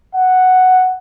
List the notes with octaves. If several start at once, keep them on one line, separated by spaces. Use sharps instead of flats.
F#5